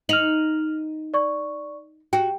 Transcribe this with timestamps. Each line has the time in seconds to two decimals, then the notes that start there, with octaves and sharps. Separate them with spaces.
0.09 D#4 F6 F7 F#7
1.14 D5 C#6
2.13 F#4 G5